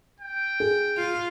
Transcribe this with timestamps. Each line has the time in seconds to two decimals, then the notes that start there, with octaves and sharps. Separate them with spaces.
0.20 G5
0.60 G#4
0.98 F4